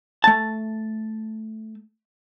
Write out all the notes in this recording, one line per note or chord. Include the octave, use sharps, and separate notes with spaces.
A3 A5